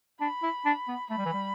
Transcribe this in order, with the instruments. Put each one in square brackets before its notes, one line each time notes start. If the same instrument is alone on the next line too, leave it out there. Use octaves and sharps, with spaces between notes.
[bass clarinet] D4 [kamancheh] B5
[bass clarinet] E4
D4
B3
[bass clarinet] A3 [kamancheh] B5
[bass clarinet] G3
E3
G3